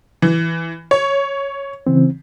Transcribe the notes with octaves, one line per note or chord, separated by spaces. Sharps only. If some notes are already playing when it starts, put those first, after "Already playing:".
E3
C#5
C#3 E3 C4